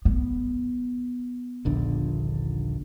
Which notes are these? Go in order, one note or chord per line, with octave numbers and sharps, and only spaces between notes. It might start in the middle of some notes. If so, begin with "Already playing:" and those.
B3
D#1 A#1 D3